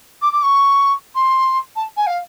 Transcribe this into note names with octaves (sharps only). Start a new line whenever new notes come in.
D6
D6
C#6
C6
A5
G#5
F5